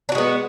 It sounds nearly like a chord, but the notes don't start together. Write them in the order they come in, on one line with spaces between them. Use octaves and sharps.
D4 F#4 G#3 B3